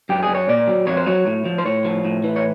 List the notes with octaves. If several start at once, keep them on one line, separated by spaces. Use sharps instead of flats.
F#2 G4
G#4
F#2
C#5
A#2 D5
F#3
F2 C#5
C5
F#3 C#5
A2
F3
C5
A2 C#5
F3
A2
E3
C#5